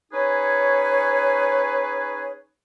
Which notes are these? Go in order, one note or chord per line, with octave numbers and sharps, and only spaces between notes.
C#4 D#4 G#4 B4 C#5